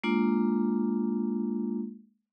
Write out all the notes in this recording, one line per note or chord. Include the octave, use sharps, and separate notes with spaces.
G#3 A#3 D4 F4